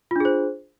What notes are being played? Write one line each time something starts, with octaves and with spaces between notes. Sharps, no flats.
D4 F4 G#4 C5